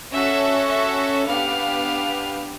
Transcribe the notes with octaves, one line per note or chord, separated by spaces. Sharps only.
C#4 F#4 A4 E5
E5
B3 D4 G4 F5